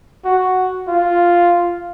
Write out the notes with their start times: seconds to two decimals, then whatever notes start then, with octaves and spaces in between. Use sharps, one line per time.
0.25 F#4
0.88 F4